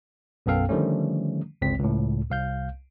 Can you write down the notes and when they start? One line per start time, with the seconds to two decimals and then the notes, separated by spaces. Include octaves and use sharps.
0.46 B1 F#2 B3 A4 F5 G5
0.69 D3 D#3 F3 G3 A3 C#4
1.62 G1 C#2 C4 B6
1.79 C#2 A2
2.30 C2 F5 G6